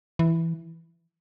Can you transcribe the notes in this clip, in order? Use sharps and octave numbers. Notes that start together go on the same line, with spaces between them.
E3